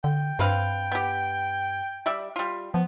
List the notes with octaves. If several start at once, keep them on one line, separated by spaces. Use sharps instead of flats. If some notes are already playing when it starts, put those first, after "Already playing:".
D3 G5
G2 C4 B4 F5
B3 G4
G3 D5 E5
G3 F4
F3 B3